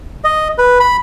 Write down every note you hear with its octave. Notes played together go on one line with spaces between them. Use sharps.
D#5
B4
B5